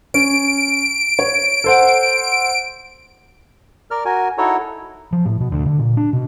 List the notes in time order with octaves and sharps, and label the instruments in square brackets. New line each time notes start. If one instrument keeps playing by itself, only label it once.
[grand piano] C#4 [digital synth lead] D7
[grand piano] C#5
A4 C5 F#5
[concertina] A#4 D5 F6
F#4 A#4 G#5
D#4 E4 F#4 A4 C#5
[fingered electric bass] F3
A2
B2
D2
D3
A#2
D4
B2